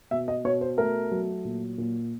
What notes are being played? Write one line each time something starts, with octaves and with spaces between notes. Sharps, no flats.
B2 E5
D#5
B2 C#5
C5
A3 A#4
F#3
A#2
A#2